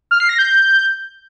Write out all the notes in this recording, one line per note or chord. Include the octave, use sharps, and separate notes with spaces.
F6
C7
A#6
G6